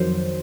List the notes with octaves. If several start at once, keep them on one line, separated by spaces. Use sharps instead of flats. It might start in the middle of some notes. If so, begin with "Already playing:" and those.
Already playing: F2 D#3 F#3 C5